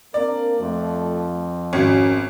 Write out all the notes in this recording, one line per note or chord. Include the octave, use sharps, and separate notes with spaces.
A#3 C4 D4 A#4 D5
F2 A3 F4
G#1 C#4 F#4